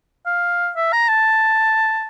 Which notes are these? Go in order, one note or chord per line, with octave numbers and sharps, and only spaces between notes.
F5
E5
A#5
A5